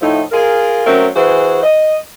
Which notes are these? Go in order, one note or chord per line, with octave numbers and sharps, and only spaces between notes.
A2 F3 A3 D#4 E4
F4 G#4 A#4
F#3 A3 C4 C#4 A#4
E3 F#4 G#4 C5
D#5